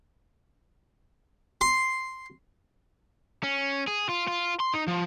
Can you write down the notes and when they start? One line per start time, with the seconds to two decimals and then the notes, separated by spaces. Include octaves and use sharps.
1.61 C6
3.43 C#4
3.87 G#4
4.09 F4
4.28 F4
4.60 C6
4.74 D#4
4.88 F3